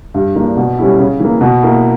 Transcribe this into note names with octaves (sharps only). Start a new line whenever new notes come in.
G2
E3 A#3 D4
B2
G3 C#4 E4
C#3
E3 A#3
B2
A#3 E4